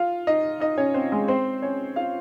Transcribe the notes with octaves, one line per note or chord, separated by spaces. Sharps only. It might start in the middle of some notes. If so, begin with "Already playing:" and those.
Already playing: F4 F5
D#4 D#5
D#4 D#5
C#4 C#5
C4 C5
G#3 G#4
C4 C5
C#4 C#5
F4 F5